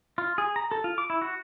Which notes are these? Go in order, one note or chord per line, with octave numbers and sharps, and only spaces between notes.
F4
G#4
A#5
A4
F4
D6
E4
F#4